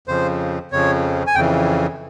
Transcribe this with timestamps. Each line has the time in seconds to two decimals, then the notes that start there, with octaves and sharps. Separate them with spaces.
0.08 F2 C#3 F3 C5
0.72 F2 C#3 F3 C#5
1.27 G#5
1.35 F2 C#3 E3 G5